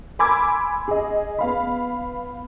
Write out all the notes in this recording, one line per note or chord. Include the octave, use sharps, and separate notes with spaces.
G#5 B5 C6 D6 E6 G#6
G#4 D#5
B3 F5 B5